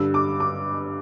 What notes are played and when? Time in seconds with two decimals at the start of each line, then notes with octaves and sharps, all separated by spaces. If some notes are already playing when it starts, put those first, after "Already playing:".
Already playing: G2 D3 G3 E6
0.14 D6
0.40 D6